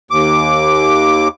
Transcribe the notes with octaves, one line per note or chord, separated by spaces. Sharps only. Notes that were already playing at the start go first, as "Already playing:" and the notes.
D#2 D6